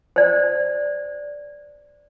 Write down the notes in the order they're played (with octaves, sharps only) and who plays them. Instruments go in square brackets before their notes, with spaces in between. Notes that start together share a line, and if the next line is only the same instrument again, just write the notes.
[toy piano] C5 D5